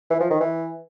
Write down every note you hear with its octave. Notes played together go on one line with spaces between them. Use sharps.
E3
F3
D#3
E3